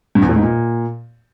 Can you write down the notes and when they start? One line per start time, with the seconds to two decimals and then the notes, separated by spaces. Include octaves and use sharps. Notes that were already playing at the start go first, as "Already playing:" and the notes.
0.15 G2
0.22 E2
0.29 A2
0.36 G#2
0.43 A#2